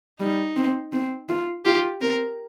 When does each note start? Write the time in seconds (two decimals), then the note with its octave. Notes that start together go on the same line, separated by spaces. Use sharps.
0.20 G3 D#4
0.56 C4
0.93 C4
1.29 F4
1.65 F4 G4
2.01 C4 A#4